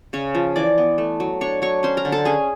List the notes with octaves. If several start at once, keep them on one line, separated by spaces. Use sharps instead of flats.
C#3 C#5 C#6
F3
E3 D5 D6
B3
A3
F#3
D4 C#5 C#6
F#3 C#5 C#6
C#4 C5 C6
A#4 A#5
D3
A4 A5
C#4 G#4 G#5